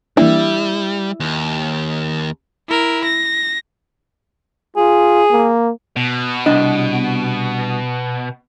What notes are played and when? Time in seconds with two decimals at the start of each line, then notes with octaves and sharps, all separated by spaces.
0.17 E3 G3 A#3 D4 E4
1.20 D#2
2.68 E4 A#4
3.05 A#6
4.77 F4 G#4
5.31 A#3
5.97 B2
6.46 C2 D4 D#5